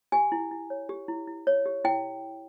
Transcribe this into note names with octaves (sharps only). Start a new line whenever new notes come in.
G4 G#5
E4
E4
C#5
G4
E4
E4
C#5
G4
E4 G5